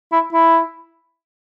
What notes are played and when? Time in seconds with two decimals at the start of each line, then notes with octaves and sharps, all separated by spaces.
0.12 E4
0.33 E4